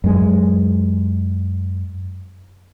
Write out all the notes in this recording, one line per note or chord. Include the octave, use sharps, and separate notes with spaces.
F#2 G#3